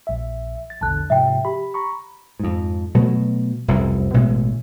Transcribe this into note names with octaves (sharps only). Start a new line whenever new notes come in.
A#1 E5
A6
A#1 E2 D3 A5 F#6
G#2 C3 F3 E5 G5
G4 B5
A#5 B5 C#6
F2 G#2
B2 F#3 A3
F1 C2 F#2
A1 B2 E3 G#3